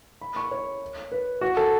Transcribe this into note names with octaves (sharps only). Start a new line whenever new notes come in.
B5
C#6
C#5
B4
F#4
A4